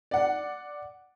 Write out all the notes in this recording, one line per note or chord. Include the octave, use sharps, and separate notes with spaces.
D5 F#5